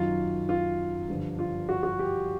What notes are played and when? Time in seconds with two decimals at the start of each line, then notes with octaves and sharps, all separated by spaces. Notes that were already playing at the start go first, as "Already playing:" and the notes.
Already playing: F#2 D#3 F#3 F4
0.49 F4
1.09 G2 D3 F3
1.39 F4
1.69 F#4
1.83 F#4
1.99 G4